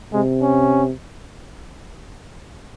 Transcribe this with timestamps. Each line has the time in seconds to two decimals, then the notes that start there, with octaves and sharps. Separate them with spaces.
0.13 C3 G#3
0.42 C#4